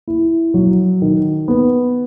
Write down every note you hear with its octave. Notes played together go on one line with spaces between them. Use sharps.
E4
F#3
D#3
B3